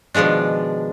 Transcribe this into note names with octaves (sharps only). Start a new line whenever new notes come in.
B2 D#3 F3 G#3 D4